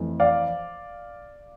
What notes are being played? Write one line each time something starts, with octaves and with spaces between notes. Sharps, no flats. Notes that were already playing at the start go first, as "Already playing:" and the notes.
Already playing: F2 E3 A3
D5 F5